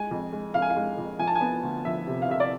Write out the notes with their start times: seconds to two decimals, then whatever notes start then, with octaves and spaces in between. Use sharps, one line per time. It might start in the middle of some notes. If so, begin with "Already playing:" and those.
Already playing: G#3 G#5
0.11 F2
0.33 G#3
0.54 F2 F5
0.62 G#5
0.70 F5
0.76 G#3
0.98 F2
1.19 F3 G#5
1.27 A5
1.35 G#5
1.41 B3
1.63 D2
1.85 F3 E5
2.07 C3
2.22 F5
2.28 C3 E5
2.40 D5